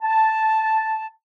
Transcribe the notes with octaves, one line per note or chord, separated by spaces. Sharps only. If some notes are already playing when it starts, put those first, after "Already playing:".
A5